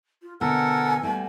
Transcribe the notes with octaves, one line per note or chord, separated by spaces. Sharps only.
F4
B2 D3 A4 A#4 F#5 G#5
G3 A3 F#4